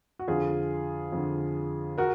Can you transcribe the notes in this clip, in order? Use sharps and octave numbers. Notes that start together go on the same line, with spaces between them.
F#4
F2 D3 F4 G#4
F2 D3
F#4 A#4